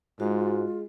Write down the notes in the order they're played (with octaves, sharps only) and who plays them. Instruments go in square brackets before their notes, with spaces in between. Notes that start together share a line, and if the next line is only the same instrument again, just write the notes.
[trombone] G#2 [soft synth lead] G#3 [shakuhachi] F4 [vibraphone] F#4